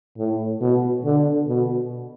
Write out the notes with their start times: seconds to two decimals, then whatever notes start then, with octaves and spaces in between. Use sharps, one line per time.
0.18 A2
0.61 B2
1.05 D3
1.48 B2